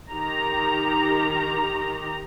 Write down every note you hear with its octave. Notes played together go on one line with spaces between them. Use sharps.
D#3 G4 A#5